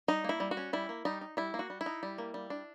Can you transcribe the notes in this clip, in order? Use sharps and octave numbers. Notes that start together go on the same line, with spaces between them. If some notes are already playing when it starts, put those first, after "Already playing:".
G3 D#4
A#3 E4
G3
F#4
C#4
G3 E4
A#3
G3 D#4
D#4
G3 E4
A#3
F#4
G3
E4
D#4
G3
A#3
G3
D4